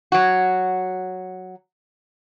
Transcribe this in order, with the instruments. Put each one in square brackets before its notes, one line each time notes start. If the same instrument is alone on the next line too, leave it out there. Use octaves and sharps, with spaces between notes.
[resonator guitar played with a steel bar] F#3 F#4